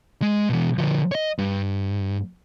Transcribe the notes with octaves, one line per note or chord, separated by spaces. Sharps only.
G#3
B2 E3
D3 F3
C#5 D#5
G2